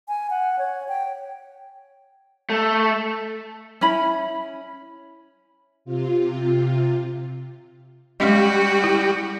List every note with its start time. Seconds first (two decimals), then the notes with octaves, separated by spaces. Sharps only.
0.08 G#5
0.30 F#5
0.59 C#5
0.88 G5
2.50 A3
3.81 C#4 E4 B5
5.85 C3 F4
8.20 G3 G#3 C#4 F#4 D#5
8.84 E4